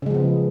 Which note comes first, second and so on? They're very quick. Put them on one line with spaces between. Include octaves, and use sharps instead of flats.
C#3 G#3 F3 B3